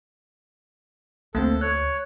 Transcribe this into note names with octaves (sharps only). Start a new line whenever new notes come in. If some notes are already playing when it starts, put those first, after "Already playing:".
D2 A3 A#3 C4 A4
C#5 F#6